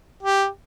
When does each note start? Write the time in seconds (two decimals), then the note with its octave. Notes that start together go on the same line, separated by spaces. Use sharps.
0.23 G4